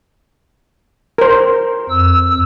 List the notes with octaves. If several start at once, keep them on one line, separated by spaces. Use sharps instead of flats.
A#4 C5
F2 E6